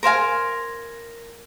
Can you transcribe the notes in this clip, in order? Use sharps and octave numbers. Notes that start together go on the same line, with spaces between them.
A#4 C5 F5 G#5